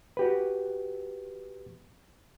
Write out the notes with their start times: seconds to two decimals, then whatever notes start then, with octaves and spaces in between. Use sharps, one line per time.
0.17 F#4 G4 B4